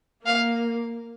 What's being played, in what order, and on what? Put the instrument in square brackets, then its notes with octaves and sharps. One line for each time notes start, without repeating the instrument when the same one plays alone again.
[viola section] A#3 [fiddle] F5